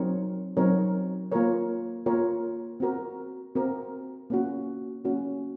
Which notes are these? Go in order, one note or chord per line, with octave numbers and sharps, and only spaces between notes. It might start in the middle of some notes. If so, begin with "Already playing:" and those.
Already playing: F#3 C4 D#4 A#4 C#5
F#3 C4 D#4 A#4 C#5
A#3 F4 A#4 C#5
A#3 F4 A#4 C#5
C4 F#4 A#4
C4 F#4 A#4
A#3 C#4 F#4
A#3 C#4 F#4